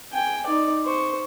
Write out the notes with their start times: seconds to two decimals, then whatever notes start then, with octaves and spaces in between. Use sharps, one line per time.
0.12 G5 G#5
0.46 D#4 D5
0.85 C5 C#6